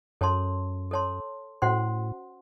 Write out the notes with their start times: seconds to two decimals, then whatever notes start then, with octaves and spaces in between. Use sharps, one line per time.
0.21 F#2 A4 C#5 A5 C6
0.91 A4 C#5 A5 C6
1.62 A2 C#4 F#4 C5 F#5 C6